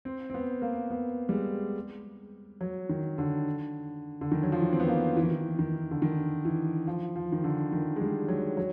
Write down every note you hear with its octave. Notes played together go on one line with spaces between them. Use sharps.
C4
C4
B3
A#3
B3
G3
G#3
F#3
D#3
D3
D3
D#3
F#3
F3
E3
C4
B3
A#3
E3
D#3
E3
D#3
D3
D#3
E3
F3
F3
D#3
D3
D#3
G#3
G3
F#3
F#3